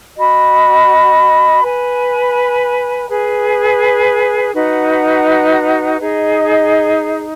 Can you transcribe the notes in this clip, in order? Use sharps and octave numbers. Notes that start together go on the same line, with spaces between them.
F#4 D#5 B5
B4 G#5 B5
G#4 B4 G#5
D#4 F#4 B4 F#5
D#4 G#4 D#5